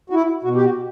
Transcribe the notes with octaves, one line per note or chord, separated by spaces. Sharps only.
F#4
E4
B2 F#4
G4
F#4